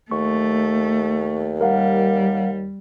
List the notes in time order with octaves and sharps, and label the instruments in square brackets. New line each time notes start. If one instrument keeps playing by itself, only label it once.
[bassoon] D#2 [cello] A3 [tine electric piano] C#6
[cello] G3 [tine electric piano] A#4 F5 F#5